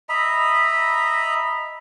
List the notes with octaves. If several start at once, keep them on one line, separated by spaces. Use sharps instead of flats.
D#5 E5 A#5 B5